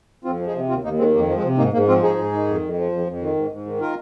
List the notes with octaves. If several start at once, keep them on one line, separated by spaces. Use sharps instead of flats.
F2 C4 F4
F3
D#4 G#4
C3
D#2 C4 F4
D#2 A#3 D#4
D#3 G#3 C4
F2 A#3
F3
G#3 C4
C3
G#2 A#3 D#4
G#2 A#3
F3 C4 F4
G#2 D#4 G#4
G#2
D#3
F2
F2
F3
F2
F2
D#3
G#2
G#2
D#3
F4 A#4